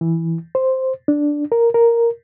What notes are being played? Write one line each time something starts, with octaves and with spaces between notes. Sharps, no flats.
E3
C5
D4
A#4
A#4